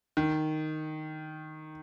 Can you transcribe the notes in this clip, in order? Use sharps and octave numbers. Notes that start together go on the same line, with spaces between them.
D#3